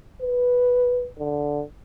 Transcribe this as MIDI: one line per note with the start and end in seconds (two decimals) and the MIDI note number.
0.22 1.07 71
1.19 1.63 50